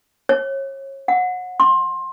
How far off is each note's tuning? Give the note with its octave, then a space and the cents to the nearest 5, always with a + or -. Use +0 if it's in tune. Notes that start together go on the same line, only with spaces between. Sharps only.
C#5 -30
F#5 -25
C6 +20